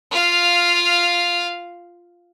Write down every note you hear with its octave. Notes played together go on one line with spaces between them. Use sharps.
F4 F5